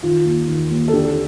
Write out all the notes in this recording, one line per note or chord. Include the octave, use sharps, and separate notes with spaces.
D#3 F4
D#2
D#3
D#2
A4
D3 G4